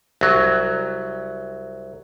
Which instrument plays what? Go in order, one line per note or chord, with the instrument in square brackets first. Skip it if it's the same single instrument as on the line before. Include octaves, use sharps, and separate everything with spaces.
[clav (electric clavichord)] C2 F#3